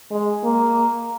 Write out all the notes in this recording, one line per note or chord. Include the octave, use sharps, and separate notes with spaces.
G#3
A#3